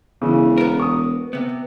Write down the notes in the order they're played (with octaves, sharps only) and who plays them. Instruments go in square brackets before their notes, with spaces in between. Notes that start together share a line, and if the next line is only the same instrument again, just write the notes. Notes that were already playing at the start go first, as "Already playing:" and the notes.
[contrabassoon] E1 [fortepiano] C#3 E3
[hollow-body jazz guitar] B3 A#4
[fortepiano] C#6 D#6
[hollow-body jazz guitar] C3 B3